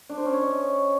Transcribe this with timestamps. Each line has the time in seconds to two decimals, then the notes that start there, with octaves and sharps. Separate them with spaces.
0.10 D4
0.18 C5
0.26 C#4
0.34 C#5
0.42 D#5